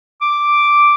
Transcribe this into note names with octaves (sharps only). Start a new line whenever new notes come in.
D6